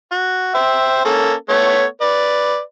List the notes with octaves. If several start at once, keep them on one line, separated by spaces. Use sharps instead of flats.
F#4
C5 E5 G5
A#3 C#4 A4
A3 B3 C#5
B4 D5